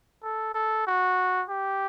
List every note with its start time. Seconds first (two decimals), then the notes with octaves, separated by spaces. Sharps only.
0.23 A4
0.54 A4
0.87 F#4
1.49 G4